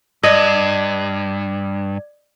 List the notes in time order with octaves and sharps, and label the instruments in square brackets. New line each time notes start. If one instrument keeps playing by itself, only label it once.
[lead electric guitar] G2 [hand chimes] D5 G#6 [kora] D#5